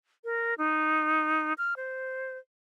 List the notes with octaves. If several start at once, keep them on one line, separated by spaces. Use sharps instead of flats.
A#4
D#4
F6
C5